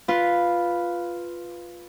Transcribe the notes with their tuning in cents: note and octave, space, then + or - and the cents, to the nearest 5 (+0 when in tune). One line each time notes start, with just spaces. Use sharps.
F4 +0 B4 +0